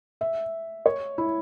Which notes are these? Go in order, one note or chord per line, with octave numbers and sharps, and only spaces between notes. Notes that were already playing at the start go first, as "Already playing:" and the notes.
E5
C#5
E4